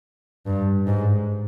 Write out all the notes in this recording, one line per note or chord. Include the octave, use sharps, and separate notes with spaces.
G2
G#2